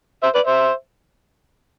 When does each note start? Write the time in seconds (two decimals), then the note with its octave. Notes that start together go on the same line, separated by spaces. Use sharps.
0.23 C5 E5
0.35 B4 D5
0.46 C5 E5